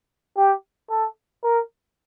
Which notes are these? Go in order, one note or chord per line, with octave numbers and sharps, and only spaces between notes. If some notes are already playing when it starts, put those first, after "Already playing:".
G4
A4
A#4